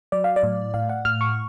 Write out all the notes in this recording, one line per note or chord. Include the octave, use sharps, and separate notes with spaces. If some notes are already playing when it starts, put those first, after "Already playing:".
F#3 D5
F5
D5
A2
A2 F5
F#5
A2 F6
C#6